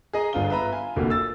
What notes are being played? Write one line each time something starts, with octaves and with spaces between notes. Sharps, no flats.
G#4 D#5 A#5
G1 B3 D4 F4 G7
B4 E5 A#5 B5
F4 G#5
F1 A#1 D3 A#3 F#4 G4
E6 A6